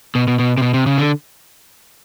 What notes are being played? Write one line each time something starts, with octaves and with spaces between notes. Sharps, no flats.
B2
B2
B2
C3
B2
C3
C#3
D3